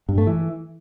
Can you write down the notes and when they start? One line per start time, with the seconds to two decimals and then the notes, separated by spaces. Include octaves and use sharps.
0.09 G2
0.18 A3
0.27 E3